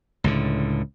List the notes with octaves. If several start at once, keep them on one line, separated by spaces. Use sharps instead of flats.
C#2 A2 D3